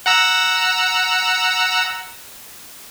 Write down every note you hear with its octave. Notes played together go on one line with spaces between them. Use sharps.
F#5 A#5 E6